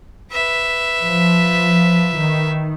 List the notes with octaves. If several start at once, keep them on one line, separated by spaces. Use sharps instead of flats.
B4 E5
F3
D#3